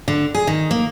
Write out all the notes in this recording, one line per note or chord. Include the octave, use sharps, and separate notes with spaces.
D3
G#4
D#3
A#3